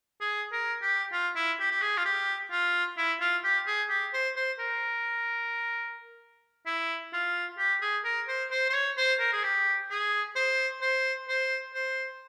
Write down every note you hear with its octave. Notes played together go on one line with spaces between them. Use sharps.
G#4
A#4
G4
F4
E4
G4
G4
G#4
F4
G4
F4
E4
F4
G4
G#4
G4
C5
C5
A#4
E4
F4
G4
G#4
A#4
C5
C5
C5
C#5
C5
A#4
G#4
G4
G#4
C5
C5
C5
C5